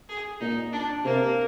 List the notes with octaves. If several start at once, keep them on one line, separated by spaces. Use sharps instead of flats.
G#4
A#2 D#4
D4
C3 A#3